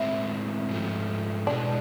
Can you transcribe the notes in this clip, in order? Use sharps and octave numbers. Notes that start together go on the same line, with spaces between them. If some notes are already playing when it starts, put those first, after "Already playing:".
Already playing: A2 G#3 C4 E4
G#2 F3 A3
B2 G#3 B3 D4